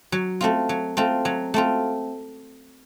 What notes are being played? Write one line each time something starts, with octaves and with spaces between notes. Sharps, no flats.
F#3
A3 C4 F4
F#3
A3 C4 F4
F#3
A3 C4 F4